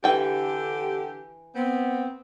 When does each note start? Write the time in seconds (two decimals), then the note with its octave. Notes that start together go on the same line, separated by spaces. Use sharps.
0.04 D3 E3 G4 G5
1.55 B3 C4